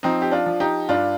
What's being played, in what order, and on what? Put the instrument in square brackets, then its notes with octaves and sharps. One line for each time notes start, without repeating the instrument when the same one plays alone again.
[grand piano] F3 C4 D#4
G4
D4 F4
F3
D#4 G4
G2 D4 F4